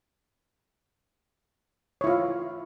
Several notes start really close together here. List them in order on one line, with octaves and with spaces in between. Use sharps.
C#5 E4 F4 F5